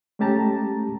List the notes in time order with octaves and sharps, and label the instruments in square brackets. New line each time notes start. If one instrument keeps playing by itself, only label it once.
[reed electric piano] G#3 A3 C#4 G4 A5 A#5